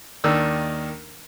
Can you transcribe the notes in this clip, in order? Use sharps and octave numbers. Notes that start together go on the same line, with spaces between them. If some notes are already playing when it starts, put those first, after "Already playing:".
D#2 D#3 D4 E6